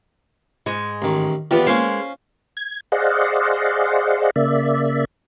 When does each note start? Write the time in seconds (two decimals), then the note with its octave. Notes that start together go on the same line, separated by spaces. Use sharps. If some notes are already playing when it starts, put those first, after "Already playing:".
0.66 G#2 G#3
1.02 A1 D#3
1.51 E2 B3 F4 G4
1.67 G#3 A#3 C#4 F4 C5
2.57 G#6
2.92 G#4 C5 D5 D#5 F5 F#5
4.36 C#3 A#3 D5 E5